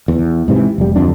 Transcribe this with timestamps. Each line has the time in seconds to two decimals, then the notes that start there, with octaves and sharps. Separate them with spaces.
0.08 E2
0.48 G#2 C3 E3
0.78 F1 G3
0.96 D1 F2 D4